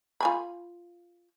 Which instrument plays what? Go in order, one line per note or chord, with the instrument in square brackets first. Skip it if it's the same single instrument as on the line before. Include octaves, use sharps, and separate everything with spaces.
[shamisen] F4 G#5 B5